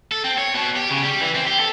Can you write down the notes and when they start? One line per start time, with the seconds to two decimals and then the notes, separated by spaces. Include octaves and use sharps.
0.12 A4
0.24 C4
0.38 C#5
0.55 B2
0.76 G4
0.91 C#3
1.03 G3
1.21 E3
1.35 C4
1.47 G4
1.59 A4